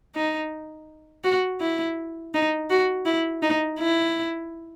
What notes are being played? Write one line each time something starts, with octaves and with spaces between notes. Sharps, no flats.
D#4
F#4
E4
D#4
F#4
E4
D#4
E4